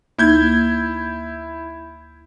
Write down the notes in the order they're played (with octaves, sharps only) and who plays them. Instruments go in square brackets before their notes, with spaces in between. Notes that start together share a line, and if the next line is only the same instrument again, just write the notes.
[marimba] D2 A#3 D#4 [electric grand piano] E4 G6 G#6